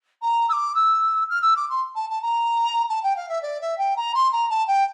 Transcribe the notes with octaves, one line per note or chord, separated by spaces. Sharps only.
A#5
E6
D6
E6
F6
E6
D6
C6
A5
A5
A#5
A5
G5
F5
E5
D5
E5
G5
A#5
C6
A#5
A5
G5